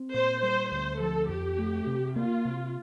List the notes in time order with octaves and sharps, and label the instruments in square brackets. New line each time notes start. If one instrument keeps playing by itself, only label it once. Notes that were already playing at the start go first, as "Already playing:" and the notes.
Already playing: [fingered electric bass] C4
[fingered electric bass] A#2 [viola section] C5
[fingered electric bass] G3 [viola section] C5
[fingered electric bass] D2 [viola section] C5
[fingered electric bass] F3 [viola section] A4
[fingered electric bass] F2 [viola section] G4
[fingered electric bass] A3
C3
[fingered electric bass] A#3 [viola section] F4
[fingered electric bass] C3